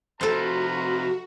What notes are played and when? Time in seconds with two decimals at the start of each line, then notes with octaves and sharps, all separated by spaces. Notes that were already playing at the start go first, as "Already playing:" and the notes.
0.21 F2 C3 F4 F#4 A4 B4 C5 A#5